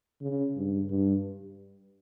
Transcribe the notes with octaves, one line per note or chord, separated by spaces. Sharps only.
C#3
G2
G2